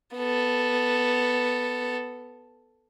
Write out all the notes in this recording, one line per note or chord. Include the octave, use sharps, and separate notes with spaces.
B3 A4